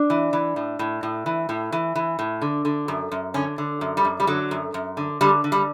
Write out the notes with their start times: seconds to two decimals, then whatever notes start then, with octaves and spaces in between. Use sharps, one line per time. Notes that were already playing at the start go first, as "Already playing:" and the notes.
Already playing: D4
0.10 E3
0.33 E3
0.56 A2
0.79 A2
1.03 A2
1.26 E3
1.49 A2
1.72 E3
1.95 E3
2.19 A2
2.42 D3
2.65 D3
2.88 F#2
3.12 F#2
3.34 D3 C#4
3.58 D3
3.81 F#2
3.97 G3
4.05 F#2
4.20 G3
4.27 D3 F#3
4.51 F#2
4.74 F#2
4.97 D3
5.21 D3 G3
5.44 D3
5.52 G3